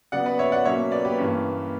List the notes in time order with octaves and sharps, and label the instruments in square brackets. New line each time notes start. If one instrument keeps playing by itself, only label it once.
[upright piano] C#3 F#3 B3 D5 F#5
B4 D5
C#5 E5
D5 F#5
B2 F#3 A#3 C#4 C#5 E5
B4 D5
G4 B4
G2 E3 A#3 C#4